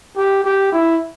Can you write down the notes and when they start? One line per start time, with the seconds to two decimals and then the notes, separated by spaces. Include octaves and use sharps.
0.16 G4
0.44 G4
0.72 E4